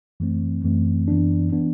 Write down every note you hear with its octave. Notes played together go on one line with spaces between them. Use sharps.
F#2 E3 A3 C4
F#2 E3 A3 C4
F#2 E3 B3 D4
E3 B3 D4